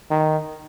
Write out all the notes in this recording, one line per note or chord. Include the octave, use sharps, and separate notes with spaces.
D#3